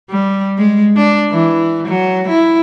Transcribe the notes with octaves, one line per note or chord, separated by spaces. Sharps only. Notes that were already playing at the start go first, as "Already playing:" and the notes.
G3
G#3
D4
E3
F#3
E4